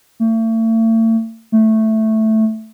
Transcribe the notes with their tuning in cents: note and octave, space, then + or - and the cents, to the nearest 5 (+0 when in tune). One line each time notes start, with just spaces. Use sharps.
A3 +40
A3 +0